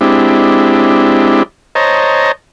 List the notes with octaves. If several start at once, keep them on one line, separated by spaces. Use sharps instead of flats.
G#3 C4 D4 E4 G4
C5 C#5 D#5 A5 A#5